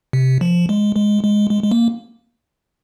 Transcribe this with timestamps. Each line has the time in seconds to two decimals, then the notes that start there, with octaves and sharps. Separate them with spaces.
0.13 C3
0.41 F3
0.69 G#3
0.96 G#3
1.23 G#3
1.50 G#3
1.63 G#3
1.71 A#3